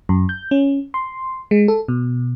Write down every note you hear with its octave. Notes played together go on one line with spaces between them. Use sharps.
F#2
G6
C#4
C6
G#3
A4
B2